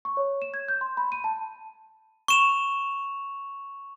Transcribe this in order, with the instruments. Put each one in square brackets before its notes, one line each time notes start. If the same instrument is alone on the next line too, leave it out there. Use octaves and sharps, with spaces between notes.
[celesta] C#6
C#5
E7
G#6
G6
C6
B5
D#7
A5
[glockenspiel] C#6 E7 F7